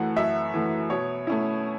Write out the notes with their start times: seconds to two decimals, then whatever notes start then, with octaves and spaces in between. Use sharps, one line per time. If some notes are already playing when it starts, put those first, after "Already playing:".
Already playing: F#2 E3 A3 F#5
0.16 F#2 E5
0.54 E3 A3
0.90 B2 C#5
1.27 A3 C#4 E4